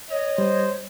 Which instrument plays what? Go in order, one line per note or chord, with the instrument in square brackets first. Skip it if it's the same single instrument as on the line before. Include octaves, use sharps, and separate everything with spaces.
[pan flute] C#5 [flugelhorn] D#5
[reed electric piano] G3 [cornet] C5